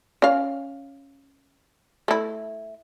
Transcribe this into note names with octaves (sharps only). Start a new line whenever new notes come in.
C#4 F5
A3 E4